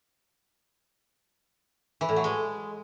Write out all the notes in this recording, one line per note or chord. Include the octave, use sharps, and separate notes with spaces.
E3
A2
F#3
G#3